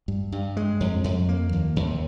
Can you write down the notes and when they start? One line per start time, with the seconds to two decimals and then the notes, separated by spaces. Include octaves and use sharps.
0.08 G2
0.32 G2
0.57 G#3
0.80 F2
1.04 F2
1.29 A#3
1.53 D#2
1.76 D#2